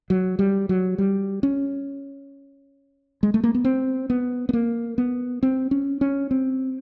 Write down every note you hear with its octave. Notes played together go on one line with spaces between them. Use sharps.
F#3
G3
F#3
G3
C#4
G#3
A3
A#3
B3
C4
B3
B3
A#3
B3
C4
C#4
C#4
C4